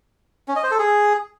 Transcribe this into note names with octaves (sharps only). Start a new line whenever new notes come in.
C#4
D#5
C5
A4
G#4